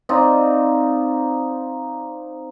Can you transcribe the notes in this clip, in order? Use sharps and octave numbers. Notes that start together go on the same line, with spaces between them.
C4 D#4 F4 D5